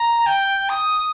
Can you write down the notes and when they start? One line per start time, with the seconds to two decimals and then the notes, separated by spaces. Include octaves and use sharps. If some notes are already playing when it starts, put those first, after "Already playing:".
Already playing: A#5
0.26 G5
0.69 D#6